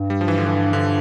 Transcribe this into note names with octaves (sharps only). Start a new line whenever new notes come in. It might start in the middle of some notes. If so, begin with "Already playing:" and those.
Already playing: G2
G3
F3
E3
D3
E3
D3